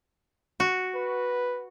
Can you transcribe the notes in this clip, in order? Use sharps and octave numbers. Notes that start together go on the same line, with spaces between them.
F#4
B4